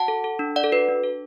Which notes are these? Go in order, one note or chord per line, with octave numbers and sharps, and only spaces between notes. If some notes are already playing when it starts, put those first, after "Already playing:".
Already playing: F#4 F#5 A5
A4
A4
D4
D4 D5 F#5
A4
F#4 B4
D4
A4